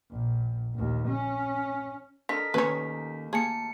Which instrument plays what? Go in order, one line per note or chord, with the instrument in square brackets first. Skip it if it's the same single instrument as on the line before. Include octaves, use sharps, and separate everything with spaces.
[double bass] A#1
A#1 D#2
C#4
[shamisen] D4 [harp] A4 A#4 D#5 [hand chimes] B6
[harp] D#2 [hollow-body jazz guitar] D#3 C#4 G#5 [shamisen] B4 C#5
[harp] A#3 [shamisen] G#4 [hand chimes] A5 C#7